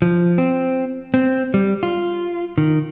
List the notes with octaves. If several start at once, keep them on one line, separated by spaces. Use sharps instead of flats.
F3
C4
C4
G3
F4
D#3